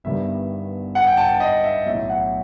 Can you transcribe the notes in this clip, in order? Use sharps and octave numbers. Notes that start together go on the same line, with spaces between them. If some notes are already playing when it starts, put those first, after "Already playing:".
G1 G2 D#3 G3 B3 E5
F#5
G5
A5
A5
D#5
E5
B1 A2 F#3 E5
F#5